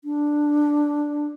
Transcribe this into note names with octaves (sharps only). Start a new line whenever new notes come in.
D4